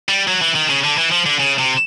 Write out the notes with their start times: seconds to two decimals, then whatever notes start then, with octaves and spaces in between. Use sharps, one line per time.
0.09 G3
0.28 F#3
0.41 E3
0.55 D#3
0.70 C#3
0.84 D3
0.98 E3
1.11 F3
1.26 D3
1.40 C#3
1.59 C3